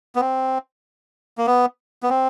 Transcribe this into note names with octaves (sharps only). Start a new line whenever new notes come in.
B3
C4
A#3
B3
B3
C4